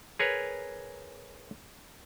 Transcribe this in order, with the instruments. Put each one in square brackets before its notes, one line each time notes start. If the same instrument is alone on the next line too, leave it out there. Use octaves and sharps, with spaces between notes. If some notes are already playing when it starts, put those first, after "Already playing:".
[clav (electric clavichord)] G#4 A#4 B4 C#5